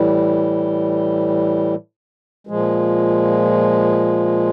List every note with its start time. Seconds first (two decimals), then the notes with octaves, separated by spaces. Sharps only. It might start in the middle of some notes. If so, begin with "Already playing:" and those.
Already playing: A2 E3 G3
2.47 A#2 F3 G#3